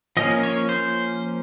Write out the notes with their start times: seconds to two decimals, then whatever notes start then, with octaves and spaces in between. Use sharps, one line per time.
0.17 F3 A#3 C#4 D#5
0.43 C#5
0.69 C5